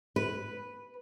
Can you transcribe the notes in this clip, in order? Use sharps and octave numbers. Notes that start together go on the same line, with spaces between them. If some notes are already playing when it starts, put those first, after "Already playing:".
B4